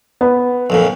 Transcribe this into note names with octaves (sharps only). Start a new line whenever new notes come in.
B3
B1 F2 A#2